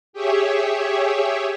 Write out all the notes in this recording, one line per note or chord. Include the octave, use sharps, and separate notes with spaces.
G4 G#4 C#5 E5